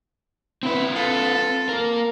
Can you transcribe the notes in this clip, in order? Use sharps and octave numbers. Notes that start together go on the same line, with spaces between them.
C4 E4 B4
F4 A4
A#3 A#4